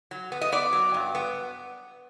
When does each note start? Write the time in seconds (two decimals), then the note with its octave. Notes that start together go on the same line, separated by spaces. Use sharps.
0.11 F#3
0.32 B3
0.41 D#5
0.52 B3 D5
0.73 F#3
0.94 G2
1.15 B3